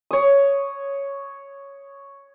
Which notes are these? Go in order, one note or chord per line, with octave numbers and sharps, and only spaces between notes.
C#5 D#6